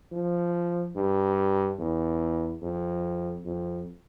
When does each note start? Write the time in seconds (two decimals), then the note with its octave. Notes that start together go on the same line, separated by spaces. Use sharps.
0.12 F3
0.96 G2
1.78 E2
2.62 F2
3.45 F2